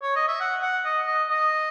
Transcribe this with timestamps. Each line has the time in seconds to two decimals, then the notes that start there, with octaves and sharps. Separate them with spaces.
0.02 C#5
0.16 D#5
0.28 E5
0.40 F#5
0.62 F#5
0.85 D#5
1.07 D#5
1.30 D#5